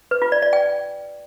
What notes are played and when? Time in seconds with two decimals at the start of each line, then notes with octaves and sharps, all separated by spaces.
0.11 B4
0.22 F4
0.32 D5
0.42 D5
0.53 G5